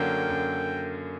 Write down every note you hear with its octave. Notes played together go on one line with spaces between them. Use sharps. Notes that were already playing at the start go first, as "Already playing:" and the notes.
Already playing: F#2 D3 F#3 A#3 C#4 G5
F#2